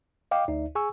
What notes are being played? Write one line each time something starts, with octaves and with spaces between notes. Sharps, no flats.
D#5 F5 G5 D6
D2 D#4 D5 E5
G#4 G#5 C#6 E6